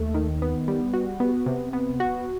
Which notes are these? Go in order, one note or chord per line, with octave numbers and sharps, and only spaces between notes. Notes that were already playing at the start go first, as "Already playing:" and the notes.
Already playing: D#2 A3
D#3
B3
G3
F#4
B3
C3
B3
F#4